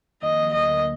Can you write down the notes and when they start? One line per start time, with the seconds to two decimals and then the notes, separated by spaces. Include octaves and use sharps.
0.22 F2 D#3 F#3 A#3 D#4 D#5
0.53 D2 D3 F#3 A#3 D#5